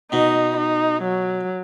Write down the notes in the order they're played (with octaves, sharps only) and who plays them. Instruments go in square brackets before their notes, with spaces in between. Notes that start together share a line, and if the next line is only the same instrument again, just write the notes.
[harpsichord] B2 [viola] D#4
[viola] D#4
F#3